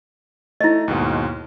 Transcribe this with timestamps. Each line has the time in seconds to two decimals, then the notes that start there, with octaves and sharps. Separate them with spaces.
0.61 A3 E4 D#5
0.88 D#2 G#2 B2